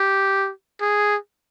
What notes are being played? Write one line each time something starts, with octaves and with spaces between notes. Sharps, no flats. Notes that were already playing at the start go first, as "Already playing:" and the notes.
Already playing: G4
G#4